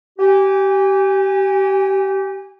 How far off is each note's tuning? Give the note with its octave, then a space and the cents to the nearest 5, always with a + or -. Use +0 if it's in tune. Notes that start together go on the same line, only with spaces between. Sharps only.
G4 -25 G#5 -35